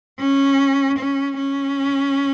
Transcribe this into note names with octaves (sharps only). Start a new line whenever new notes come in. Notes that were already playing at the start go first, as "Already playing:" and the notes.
C#4
C#4
C#4